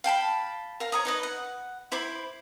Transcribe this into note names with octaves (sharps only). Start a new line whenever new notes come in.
F5 G5 A5 B5
A#4 F5
C#5 A#5 D#6
D#4 B4 D#5
F#5
E4 C5 B5 D6